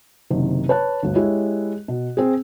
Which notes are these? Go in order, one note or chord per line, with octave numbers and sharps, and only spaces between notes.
F#1 C3 D#3
B4 C#5 A5 F#6
G1 D2
G#3 E4 G4 C#5
B2
C4 G#4